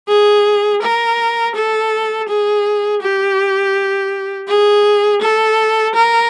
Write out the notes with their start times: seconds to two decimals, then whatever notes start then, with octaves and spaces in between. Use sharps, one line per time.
0.08 G#4
0.82 A#4
1.55 A4
2.29 G#4
3.02 G4
4.48 G#4
5.22 A4
5.95 A#4